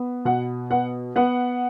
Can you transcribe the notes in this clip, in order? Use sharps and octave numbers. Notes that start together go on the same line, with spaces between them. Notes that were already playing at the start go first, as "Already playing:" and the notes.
Already playing: B3
B2 F#5
B3 F#5
B3 F#5